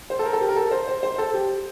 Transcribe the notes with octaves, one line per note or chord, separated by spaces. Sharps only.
C5
A4
A#4
A4
G4
A#4
A4
C5
C5
C5
A4
G4